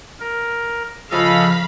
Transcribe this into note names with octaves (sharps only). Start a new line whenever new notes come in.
A#4
C#3 F3 A4 D#5 F5 B5